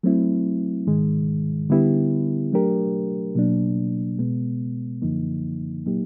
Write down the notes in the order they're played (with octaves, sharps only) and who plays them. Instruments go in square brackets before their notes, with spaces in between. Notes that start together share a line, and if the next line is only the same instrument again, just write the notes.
[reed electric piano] F#3 A3 C4 E4
G#2 D#3 G#3
D3 G3 B3 E4 G4
F#3 A3 D4 G4 A#4
B2 F#3 A#3 D4
B2 G#3 B3
F#2 D3 F3 A#3 D#4
A#2 F#3 A#3 D#4 G4